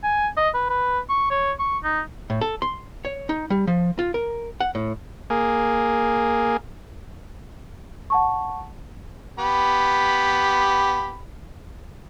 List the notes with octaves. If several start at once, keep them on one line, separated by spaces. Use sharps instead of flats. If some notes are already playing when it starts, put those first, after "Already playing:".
G#5
D#5
B4
B4
C#6
C#5
C#6
D#4
A2
A4
C6
C#5
D#4
G3
F3
F4
A#4
F#5
A2
A#3 G#4
F#5 A5 C#6
B3 G4 B5